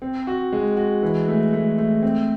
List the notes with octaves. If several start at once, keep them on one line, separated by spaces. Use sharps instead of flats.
C4
F#4
G#3
F#4
E3
A3
A3
A3
C4